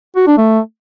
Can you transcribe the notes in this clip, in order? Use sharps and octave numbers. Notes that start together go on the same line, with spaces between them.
F#4
D4
A3